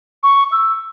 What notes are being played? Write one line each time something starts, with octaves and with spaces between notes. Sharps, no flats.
C#6
E6